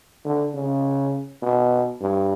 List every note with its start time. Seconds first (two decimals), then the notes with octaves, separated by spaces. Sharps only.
0.25 D3
0.54 C#3
1.42 B2
2.00 G2